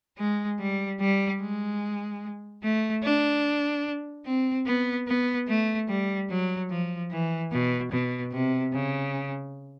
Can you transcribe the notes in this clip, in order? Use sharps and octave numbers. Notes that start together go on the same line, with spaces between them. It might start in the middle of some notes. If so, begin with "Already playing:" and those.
G#3
G3
G3
G#3
A3
D4
C4
B3
B3
A3
G3
F#3
F3
E3
B2
B2
C3
C#3